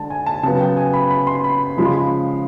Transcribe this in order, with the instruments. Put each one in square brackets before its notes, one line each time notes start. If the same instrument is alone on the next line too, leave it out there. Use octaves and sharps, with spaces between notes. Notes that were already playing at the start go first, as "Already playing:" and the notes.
Already playing: [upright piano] D3 G#3 A5
G#5
A5
C#3 F#3 B3 A5
G5
G#5
B5
B5
C6
B5
C#3 F3 G#3 B5
C6
B5